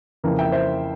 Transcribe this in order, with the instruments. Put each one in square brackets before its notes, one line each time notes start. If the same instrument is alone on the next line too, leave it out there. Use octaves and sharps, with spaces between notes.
[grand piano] F2 C#3 E3 A#3
E5 G5
C5 E5